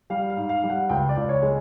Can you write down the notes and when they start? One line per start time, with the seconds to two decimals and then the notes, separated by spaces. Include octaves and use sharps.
0.10 G3 F5
0.30 F5
0.37 G#2
0.49 F5
0.63 G3
0.70 F#5
0.89 C#2 G5
1.09 D5
1.17 C#2
1.29 C#5
1.42 G#3